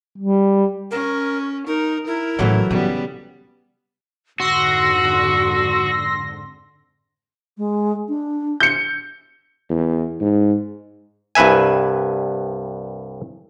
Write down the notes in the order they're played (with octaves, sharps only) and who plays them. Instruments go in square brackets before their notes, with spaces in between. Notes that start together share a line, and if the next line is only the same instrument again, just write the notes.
[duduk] G3
[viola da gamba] C#4 [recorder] A#4
[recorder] D#4 [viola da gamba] A#4
[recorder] E4 [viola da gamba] A#4
[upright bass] A2 C#3 [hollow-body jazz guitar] E3 F#3 A3
[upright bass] C#3 [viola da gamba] G3 B3
[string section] F2 G#2 D3 [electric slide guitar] F#4 [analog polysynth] C6 A#6 [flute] E6
[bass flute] G#3
D4
[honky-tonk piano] G6 C#7
[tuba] E2
G#2
[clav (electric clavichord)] C2 G2 B4 E5 G#5